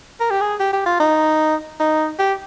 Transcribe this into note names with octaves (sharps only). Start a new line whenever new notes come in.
A#4
G4
G#4
G4
G4
F4
D#4
D#4
G4